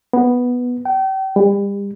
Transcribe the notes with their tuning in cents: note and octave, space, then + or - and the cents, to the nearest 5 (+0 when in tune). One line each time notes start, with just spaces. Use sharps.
B3 -5
G5 -35
G3 +35